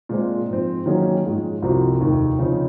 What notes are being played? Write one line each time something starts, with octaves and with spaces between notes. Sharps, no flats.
A#2 G#3 C4 F4
G#2 F3 C4
D#3 F#3 A#3 C#4 G#4
G#2 F3 G#3 C#4
C2 C3 F3 C4 F#4
F1 D#2 D#3 A#3 D#4
C#3 F3 C4 D#4